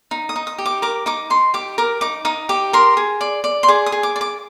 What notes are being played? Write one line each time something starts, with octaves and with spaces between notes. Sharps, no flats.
D#4
D#6
D#4
D#6
G4
D6
A#4 D6
D#4 D6
D#4 C6
G4 D6
A#4 D6
D#4 D6
D#4 D#6
G4 D6
A#4 C6
G#4
D5
D5
C6
G#4 D6
D#6
G#4
D6
D5
D6